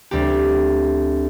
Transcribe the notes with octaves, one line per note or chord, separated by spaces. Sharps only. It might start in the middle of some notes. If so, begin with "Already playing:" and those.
D2 G3 C4 G4